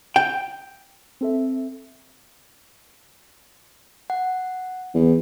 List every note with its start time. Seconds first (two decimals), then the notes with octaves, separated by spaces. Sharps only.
0.16 G5
1.21 C4 A4 E5
4.10 F#5
4.94 E2